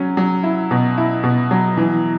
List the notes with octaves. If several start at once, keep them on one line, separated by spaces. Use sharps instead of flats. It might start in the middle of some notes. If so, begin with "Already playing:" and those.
Already playing: F#3 C#4
F#3
E4
B2
E4
B2
F#3
E3